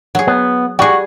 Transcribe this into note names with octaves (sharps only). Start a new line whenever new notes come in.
F#3 G#4
B3
G3 F#4 G#4